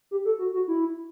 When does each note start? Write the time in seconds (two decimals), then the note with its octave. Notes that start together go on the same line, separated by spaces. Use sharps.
0.11 G4
0.25 A4
0.39 F#4
0.53 F#4
0.68 E4